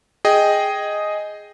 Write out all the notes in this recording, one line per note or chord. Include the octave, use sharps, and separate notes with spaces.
G#4 D#5 G5